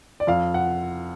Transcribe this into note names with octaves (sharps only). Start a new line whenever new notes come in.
D5
F2 F5
F#5